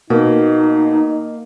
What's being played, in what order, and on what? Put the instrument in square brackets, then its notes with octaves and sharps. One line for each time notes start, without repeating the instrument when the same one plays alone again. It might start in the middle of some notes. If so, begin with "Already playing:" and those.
[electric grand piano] B2 [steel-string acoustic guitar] A#3 [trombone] D#4